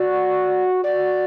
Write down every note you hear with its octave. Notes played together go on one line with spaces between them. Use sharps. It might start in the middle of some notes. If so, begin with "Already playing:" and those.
Already playing: F#4 D5
F#4 D5